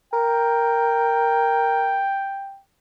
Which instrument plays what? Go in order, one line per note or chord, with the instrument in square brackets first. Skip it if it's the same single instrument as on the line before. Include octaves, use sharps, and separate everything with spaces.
[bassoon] A#4 [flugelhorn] G5